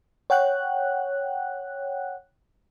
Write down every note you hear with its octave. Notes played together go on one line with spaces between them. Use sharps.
C#5 F#5 G5 F#6